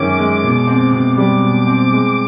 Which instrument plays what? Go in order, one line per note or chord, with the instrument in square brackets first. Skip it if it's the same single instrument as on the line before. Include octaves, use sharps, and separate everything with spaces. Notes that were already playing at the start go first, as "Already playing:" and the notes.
Already playing: [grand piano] F#2 D#3 G#3 C#4 [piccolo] D6
[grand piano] G#3
B2
C4
B2
[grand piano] G3 [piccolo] D6
[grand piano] B2
C4
G#3